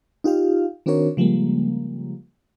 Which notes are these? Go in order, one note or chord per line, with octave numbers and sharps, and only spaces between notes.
D#4 F4 G4 F5
D#3 C4 D4 F#4 A#4 C#5
C#3 F3 G3 G#3 A#3